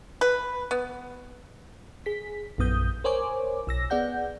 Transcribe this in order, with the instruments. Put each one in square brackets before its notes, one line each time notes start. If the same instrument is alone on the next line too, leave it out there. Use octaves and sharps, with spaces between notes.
[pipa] B4
B3
[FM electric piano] G#4 B6
A#1 F#2 B3 D#6 G6
A#4 C5 C#5 G#5 D6
B1 E6 A#6
B3 G#4 D5 F#5 G6